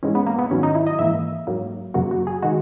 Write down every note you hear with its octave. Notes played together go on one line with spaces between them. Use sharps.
G#2 E3 G#3 C#4
B3
A#3
B3
G#2 D#3 F#3 C#4
D#4
E4
D#5
G#2 E3 A#3 E5
G#2 F#3 A#3
F#2 C#3 F#3 A#3 F#4
F#4
G#4
D#3 G#3 F#4